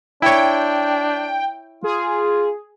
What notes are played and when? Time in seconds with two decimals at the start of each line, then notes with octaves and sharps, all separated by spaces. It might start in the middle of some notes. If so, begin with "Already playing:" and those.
0.22 D4 E4 C#5 G5
1.84 F4 G#4